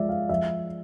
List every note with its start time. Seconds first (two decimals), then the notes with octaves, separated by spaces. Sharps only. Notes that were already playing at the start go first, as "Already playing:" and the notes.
Already playing: F3 G#3 D5 E5
0.09 F5
0.29 F3 E5